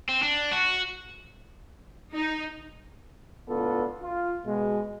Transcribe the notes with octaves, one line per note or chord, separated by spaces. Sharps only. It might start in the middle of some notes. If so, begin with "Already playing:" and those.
C4
D4
F#4
D#4
C#2 A2 B3 D4 F4 A4
F4
B2 G#3